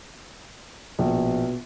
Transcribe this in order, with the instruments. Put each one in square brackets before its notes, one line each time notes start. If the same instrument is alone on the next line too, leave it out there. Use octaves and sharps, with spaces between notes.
[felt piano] A#1 [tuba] B2